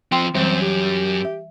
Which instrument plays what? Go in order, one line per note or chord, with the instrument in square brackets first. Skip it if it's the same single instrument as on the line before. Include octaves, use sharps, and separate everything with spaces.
[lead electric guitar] F3 C4 [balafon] G5 C6
[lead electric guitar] F#2 [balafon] E3 G3 [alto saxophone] C4
[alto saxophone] G4
[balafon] E5